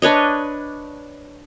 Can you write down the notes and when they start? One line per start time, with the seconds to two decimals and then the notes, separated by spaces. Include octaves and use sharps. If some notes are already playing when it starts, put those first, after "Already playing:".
0.02 D4 B4 C#5 D#5